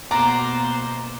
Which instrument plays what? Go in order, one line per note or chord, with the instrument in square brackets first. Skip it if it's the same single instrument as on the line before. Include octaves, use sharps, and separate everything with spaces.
[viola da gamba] B2 A#3 C5 [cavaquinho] D5 F#5 [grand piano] A#5